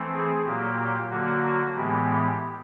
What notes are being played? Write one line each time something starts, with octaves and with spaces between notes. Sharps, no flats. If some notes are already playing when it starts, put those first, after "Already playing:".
Already playing: E3 A3 C4
G#4
A#2 F#3 A#3 G4
D3 F#3 A#3 F#4
A2 E3 G#3 B3 G4